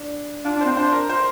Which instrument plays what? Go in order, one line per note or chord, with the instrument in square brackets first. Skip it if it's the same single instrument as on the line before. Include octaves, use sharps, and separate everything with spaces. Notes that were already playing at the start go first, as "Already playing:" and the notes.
Already playing: [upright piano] D4
[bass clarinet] D4 [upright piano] F4
[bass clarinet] D4
[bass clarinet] C4 [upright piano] C5
[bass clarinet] D4 [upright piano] C5
[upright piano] A#4
C5